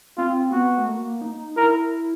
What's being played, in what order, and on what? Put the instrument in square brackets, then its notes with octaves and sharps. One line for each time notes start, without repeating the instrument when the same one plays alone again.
[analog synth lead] C4 [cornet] F4
[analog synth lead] B3 [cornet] F#4
[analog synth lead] A3
A#3
D#4
[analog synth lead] E4 [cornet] A#4